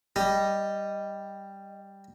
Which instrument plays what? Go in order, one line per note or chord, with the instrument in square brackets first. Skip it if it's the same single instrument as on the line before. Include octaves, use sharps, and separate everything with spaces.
[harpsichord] G3 [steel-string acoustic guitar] D#5